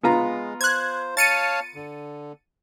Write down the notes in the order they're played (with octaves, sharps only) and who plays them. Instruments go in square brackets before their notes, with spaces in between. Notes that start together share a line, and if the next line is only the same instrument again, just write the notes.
[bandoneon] G#3 [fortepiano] B3 F4 A#5
[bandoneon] C5 [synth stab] F#6 G#6
[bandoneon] C#5 F5 A5 [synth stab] A6 C#7 D#7
[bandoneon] D3